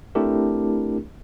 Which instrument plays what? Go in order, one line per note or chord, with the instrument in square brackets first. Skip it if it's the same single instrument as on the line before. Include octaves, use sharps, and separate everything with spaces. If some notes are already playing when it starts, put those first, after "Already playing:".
[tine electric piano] A3 C4 D4 E4 G4 A#4